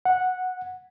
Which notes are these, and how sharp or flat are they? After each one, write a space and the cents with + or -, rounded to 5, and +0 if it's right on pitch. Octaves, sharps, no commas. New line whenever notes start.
F#5 -10